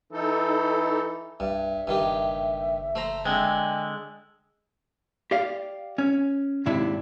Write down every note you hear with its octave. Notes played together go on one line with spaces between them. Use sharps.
E3 D#4 A4
C2 G2 E5
F#1 G2 D#3 G4
A3 C5 A#5
D3 G#3 C4
G4 D5 F5
C#4
D#2 G#2 C3 D4 E4